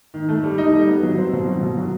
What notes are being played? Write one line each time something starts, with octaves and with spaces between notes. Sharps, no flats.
D#3
A3
G3
D#4
G3
B3
F#3
C4
B2
F#3
B2
F#3